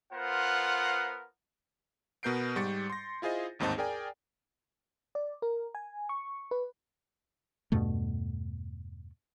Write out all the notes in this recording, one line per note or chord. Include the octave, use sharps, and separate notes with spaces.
B3 F4 A#4 C5 F#5
B2 B3 A#4 G6 C7 D7
G#2 G3 C#6 A6 C#7
C6 A#6
E4 F4 G#4 C5 D#5
A1 D#2 G#2 C4 D#4 A5
G#4 A#4 D5 G5 G#5
D5
A#4
G#5
C#6
B4
E2 G2 B2 A3